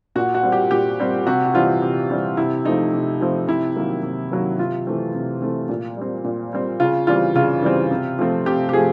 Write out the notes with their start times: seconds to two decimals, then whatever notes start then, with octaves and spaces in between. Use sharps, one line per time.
0.15 A#2 F#4
0.35 F#4
0.43 G3 C4
0.52 G4
0.71 A#2 G4
1.00 G3 C4
1.27 C3 F#4
1.46 F#4
1.54 E3 G3 C4 F4
1.82 C3
2.10 E3 G3 C4
2.37 C3 E4
2.65 F3 A3 C4 D#4
2.93 C3
3.21 F3 A3 C4
3.47 C3 E4
3.76 D#3 F#3 A#3
4.03 C3
4.32 D#3 F#3 A#3
4.58 C3 F4
4.87 E3 A3 C4
5.15 C3
5.42 E3 A3 C4
5.69 A#2
5.97 G3 C4
6.24 A#2
6.53 G3 C4
6.80 C#3 F4
7.07 E3 G3 C4 F4
7.36 C#3 F4
7.62 E3 G3 C4
7.91 C3
8.19 F3 A3 C4
8.46 C3 G4
8.69 G4
8.73 F3 A3 G#4